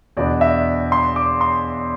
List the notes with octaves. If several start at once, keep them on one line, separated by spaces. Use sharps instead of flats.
E2 B2 B3 D4 D5
E5
C6
D6
C6